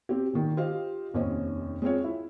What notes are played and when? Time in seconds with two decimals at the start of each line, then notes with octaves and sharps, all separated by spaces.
0.09 C4 G4
0.33 A#2 D#3
0.57 F4 G4 C5 D#5 F5
1.14 F1 D#2 C#4 C5 D#5
1.82 G#3 C4 F4 C#5
2.04 E4